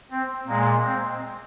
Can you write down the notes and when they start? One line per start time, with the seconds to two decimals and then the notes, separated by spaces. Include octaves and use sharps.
0.11 C4
0.47 A#2 G#3 A#3
0.84 C4